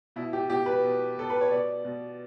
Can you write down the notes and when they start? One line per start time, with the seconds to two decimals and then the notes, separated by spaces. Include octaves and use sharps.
0.16 B2 E4
0.33 G4
0.49 B2 G4
0.66 B4
0.84 B2
1.18 B2 A4
1.30 B4
1.41 C#5
1.51 B2 D5
1.85 B2